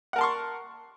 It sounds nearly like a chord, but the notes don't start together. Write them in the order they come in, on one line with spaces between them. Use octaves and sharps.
F#5 A#4 A5 C6 C#6